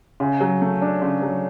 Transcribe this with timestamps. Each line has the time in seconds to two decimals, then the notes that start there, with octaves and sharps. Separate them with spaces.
0.20 C#3
0.40 F#3
0.62 A3
0.82 D4
1.02 C#3
1.22 F#3